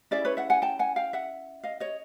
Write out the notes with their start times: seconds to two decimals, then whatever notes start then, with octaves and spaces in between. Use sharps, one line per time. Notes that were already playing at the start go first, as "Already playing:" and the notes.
0.11 C#4 E4 G#4 D5 E5
0.25 B4 C#5
0.37 E5 F#5
0.50 F#5 G#5
0.62 G5 A5
0.79 F#5 G#5
0.96 F5 G5
1.13 E5 F#5
1.63 D#5 F5
1.80 C#5 D#5